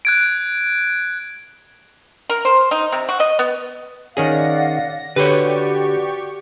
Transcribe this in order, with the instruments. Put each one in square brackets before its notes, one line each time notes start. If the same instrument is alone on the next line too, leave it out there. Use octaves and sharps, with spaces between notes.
[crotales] F#6 G#6 D7
[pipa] A#4
C5
D#4
C3
F#4
D#5
B3
[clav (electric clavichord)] D#3 C#4 G#4 [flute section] D5 F5 F#5 [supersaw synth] A#6
[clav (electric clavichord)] D3 [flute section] F#4 D5 [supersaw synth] G4 C#6 [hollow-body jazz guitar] B4 C#5